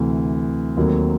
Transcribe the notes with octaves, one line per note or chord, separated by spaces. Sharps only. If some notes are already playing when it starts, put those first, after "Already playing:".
Already playing: D2 C3 E3
D#2 D#3 F#3 A3 C4